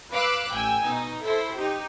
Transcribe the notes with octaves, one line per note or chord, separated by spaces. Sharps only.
B4 F5 B5 D6 E6 F#6
A1 G5 G#5 E6
B2 D#4
E4 A4 C5
D#4 G4